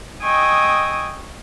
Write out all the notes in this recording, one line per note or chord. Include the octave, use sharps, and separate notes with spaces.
D#5 G5 G#5 C#6 D#6 E6